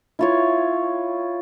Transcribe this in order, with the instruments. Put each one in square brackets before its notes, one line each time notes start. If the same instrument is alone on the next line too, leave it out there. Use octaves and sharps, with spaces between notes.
[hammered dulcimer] E4 F4 C#5